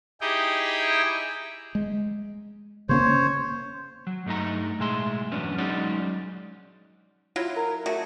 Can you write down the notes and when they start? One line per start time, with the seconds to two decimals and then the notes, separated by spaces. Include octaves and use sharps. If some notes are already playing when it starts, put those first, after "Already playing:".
0.21 D#4 E4 G4 G#4 G5
1.75 G#3
2.89 C#3 A#3 C#4 C5 C#5
4.07 F#3
4.26 G2 A3 D#4 A#5
4.79 B1 A2 G#3 G#4 E5 C6
5.31 E2 G2 F#3 B3 C#4 D4
5.58 F#3 G#3 C#4 D#4 F#4 D5
7.36 F#3 E4 F4
7.57 A#4
7.86 D3 A3 F#4 G#4